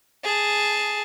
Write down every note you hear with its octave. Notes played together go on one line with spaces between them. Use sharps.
G#4 A5